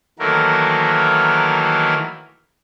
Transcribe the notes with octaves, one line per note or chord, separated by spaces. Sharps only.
D#3 E3 F#3 A3 A#3 A#4